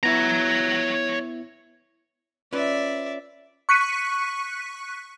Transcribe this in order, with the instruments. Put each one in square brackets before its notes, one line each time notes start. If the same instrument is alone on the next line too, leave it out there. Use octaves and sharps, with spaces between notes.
[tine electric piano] B3 E4 E5 [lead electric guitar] C#5 A#5
[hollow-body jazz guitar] C#4 F4 B4 [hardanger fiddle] D5 E5
[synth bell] C#6 F#6 B6 C#7 D#7